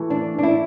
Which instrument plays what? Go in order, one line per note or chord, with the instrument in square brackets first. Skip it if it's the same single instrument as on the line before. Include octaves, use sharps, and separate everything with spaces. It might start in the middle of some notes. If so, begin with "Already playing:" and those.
Already playing: [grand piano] E3 A3 E4
[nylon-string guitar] D4
D4
E4